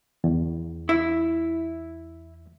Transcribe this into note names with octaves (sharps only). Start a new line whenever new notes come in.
E2
E4